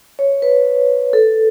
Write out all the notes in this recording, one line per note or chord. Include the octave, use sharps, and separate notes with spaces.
C#5
B4
A4